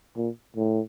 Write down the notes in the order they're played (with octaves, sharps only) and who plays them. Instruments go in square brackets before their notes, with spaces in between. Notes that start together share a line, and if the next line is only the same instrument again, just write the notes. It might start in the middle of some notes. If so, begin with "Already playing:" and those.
[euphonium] A#2
A2